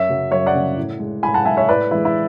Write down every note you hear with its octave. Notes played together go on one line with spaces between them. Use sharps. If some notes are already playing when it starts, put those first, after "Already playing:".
Already playing: F#2 C#5 E5
C#3 F#3
F#2 C#5 E5
D5 F#5
C#3 F#3
A2
G#3
A2 G#5 B5
F#5 A5
G#3 E5 G#5
C#5 E5
A2 B4 D5
E3 G#3 E4
E4